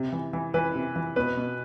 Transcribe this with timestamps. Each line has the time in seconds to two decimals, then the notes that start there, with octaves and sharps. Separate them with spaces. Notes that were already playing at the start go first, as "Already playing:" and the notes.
Already playing: C3
0.12 E3
0.33 E3
0.54 E3 B4
0.75 C3
0.96 E3
1.16 B2 B4
1.37 B2